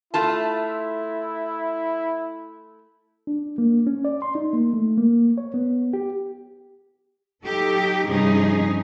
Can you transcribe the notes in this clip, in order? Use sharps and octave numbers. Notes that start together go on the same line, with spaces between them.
A3 E4 F4 A5
D4
A#3
C#4
D5
C6
D#4
A#3
A3
A#3
C#5
B3
G4
F#3 D#4 G4 A4
G2 C3 F3 C#4 D#4 G#4